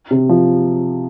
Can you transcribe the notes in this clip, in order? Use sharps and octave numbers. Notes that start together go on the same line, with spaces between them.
C3
F3